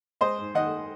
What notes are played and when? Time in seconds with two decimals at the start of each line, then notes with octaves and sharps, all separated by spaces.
0.21 G#3 C5 D#5
0.38 G#2
0.54 D#3 D#5 F#5